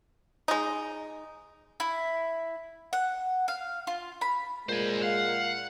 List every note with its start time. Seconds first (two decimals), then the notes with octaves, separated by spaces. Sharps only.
0.48 G#3 D#4
1.80 E4
2.93 F#5
3.48 F5
3.87 F4
4.21 B5
4.69 A#2 G#3 C5 G#5
5.02 F5 F#5